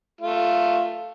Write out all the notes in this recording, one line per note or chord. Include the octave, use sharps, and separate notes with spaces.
A3 F4